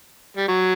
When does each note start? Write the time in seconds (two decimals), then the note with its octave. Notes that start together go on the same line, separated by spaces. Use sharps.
0.37 G3
0.48 F#3